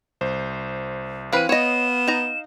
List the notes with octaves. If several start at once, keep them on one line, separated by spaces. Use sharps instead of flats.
C2 C5
E3 C4 B4 F5 F#6 D#7
B3 C#5 D#5 E7
D#4 A#5